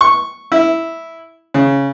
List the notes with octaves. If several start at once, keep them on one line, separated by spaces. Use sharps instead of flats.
C#6
E4
C#3